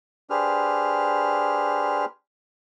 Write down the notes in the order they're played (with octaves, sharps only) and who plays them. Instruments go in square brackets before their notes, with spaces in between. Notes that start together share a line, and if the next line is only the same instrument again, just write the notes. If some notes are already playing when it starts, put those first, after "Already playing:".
[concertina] D4 G4 G#4 B4 C5 F6